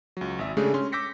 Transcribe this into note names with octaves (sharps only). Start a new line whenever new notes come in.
C#2 F#3
G#1 E5
C#3 G#3 A3 D4 G4 G#4
C#4 C6
D6 E6 G6 A#6 B6 C#7